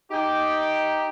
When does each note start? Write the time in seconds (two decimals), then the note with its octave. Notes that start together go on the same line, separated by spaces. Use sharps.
0.11 D#4 G4